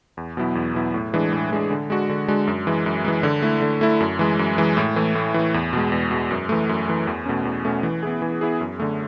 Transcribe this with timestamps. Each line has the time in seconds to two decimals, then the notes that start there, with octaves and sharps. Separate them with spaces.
0.17 E2
0.37 B2 F#3 B3 E4
0.55 E2
0.74 B2 F#3 B3 E4
0.94 A2
1.13 E3 G#3 D4 G#4
1.32 A2
1.51 E3 G#3 D4 G#4
1.71 D3
1.90 G#3 D4 F#4
2.09 D3
2.28 G#3 D4 F#4
2.47 F#2
2.67 E3 G#3
2.86 F#2
3.05 E3 G#3
3.23 D3
3.42 A3 E4
3.62 D3
3.81 A3 E4
4.00 F#2
4.19 E3 G#3
4.39 F#2
4.58 E3 G#3
4.77 A2
4.96 E3 A3
5.15 A2
5.34 E3 A3
5.54 E2
5.73 B2 G#3
5.92 E2
6.11 B2 G#3
6.31 F#2
6.49 E3 A3
6.69 F#2
6.88 E3 A3
7.07 E2
7.26 B2 A3 C#4
7.45 E2
7.65 B2 A3 C#4
7.83 E3
8.03 B3 E4 G#4
8.22 E3
8.41 B3 E4 G#4
8.61 F#2
8.80 D3 A3